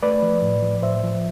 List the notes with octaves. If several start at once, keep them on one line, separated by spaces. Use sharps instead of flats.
A3 B4 D5
F3
A2
F3
A2 C5 E5
F3